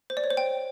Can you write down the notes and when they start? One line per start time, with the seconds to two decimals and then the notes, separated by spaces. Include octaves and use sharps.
0.10 C5
0.17 D5
0.24 C#5
0.30 C5
0.37 G5